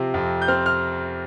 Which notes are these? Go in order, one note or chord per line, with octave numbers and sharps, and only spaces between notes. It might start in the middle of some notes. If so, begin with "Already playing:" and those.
Already playing: C3 F3 C4
F2
G6
C4 F6
F6